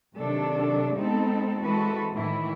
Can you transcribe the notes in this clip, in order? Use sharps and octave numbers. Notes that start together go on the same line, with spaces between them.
C3 D#3 F#3 D4 A4
G#3 B3 C4 D#4 A4
E3 G#3 C4 F#4 A4 B4
A2 D#3 E3 E4